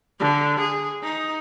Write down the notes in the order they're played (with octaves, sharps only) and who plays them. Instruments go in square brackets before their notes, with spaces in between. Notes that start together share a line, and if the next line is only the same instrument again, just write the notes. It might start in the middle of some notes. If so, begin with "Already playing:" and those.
[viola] D3
G#4
D#4